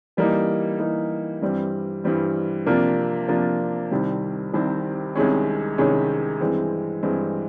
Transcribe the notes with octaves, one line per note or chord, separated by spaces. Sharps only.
E3 G3 A#3 D#4
E3 G3 A#3 D#4
G2 E3 G3 C4
G2 E3 G3 C4
C3 F3 A#3 D4 F4
C3 F3 A#3 D4 F4
C2 C3 D#3 G3 C4
C2 C3 D#3 G3 C4
C2 C3 D#3 G#3 C#4
C2 C3 D#3 G#3 C#4
G2 E3 G#3 C4
G2 E3 G#3 C4